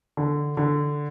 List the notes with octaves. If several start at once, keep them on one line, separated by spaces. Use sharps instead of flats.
D3
D3